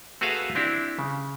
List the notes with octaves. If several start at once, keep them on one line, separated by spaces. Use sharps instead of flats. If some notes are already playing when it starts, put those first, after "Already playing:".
A3 F#4 G#4 B4 E5 F5
C4 D4 E4 G4
C#3